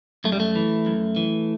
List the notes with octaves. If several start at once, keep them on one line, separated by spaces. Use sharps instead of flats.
F#2 A3
G3
A3
E3
F#2
E3